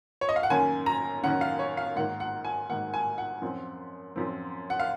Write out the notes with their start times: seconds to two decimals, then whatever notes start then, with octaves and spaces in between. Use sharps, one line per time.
0.21 C#5
0.29 D#5
0.36 F5
0.43 F#5
0.50 F#2 D#3 A#3 C#4 G#5
0.86 A#5
1.23 F#2 D#3 A#3 C#4 F#5
1.41 F5
1.59 C#5
1.77 F5
1.96 G#2 D#3 A#3 F#5
2.20 F#5
2.45 G#5
2.70 G#2 D#3 A#3 F#5
2.94 G#5
3.18 F#5
3.42 F#2 F3 C4
4.16 F#2 F3 C4
4.70 F#5
4.80 F5